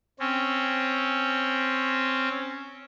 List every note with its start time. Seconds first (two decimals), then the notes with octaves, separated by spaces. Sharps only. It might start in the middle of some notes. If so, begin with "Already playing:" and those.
0.20 C4 C#4